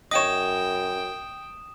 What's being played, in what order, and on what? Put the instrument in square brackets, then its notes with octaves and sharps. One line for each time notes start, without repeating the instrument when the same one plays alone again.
[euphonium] F#2 [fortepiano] C#5 D#5 [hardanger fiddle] G5 [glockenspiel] D#6 E7